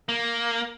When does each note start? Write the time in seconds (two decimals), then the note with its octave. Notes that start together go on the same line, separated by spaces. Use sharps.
0.09 A#3